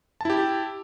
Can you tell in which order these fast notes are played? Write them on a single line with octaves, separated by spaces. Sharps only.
A5 E4 G4